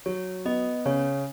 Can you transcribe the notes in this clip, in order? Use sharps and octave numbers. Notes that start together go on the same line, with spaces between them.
F#3 C#5
B3 D#5
C#3 C#5